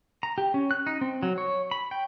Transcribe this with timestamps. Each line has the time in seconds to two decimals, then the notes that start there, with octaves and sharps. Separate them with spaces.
0.23 A#5
0.38 G4
0.54 C#4
0.71 F#6
0.87 D#4
1.01 C4
1.23 F#3
1.38 C#5
1.71 B5
1.91 G5